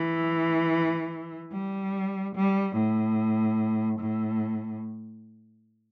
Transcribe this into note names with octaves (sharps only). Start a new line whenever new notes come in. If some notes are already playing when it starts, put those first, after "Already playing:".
Already playing: E3
G3
G3
A2
A2